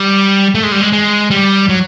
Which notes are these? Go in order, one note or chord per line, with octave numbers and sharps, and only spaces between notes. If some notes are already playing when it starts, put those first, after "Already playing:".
Already playing: G3
A3
G#3
G3
G#3
G#3
G3
F#3